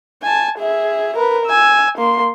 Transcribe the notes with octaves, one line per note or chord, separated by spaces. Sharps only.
G#5 A5
G#4 E5
A#4 B4
G#5 E6
A#3 C6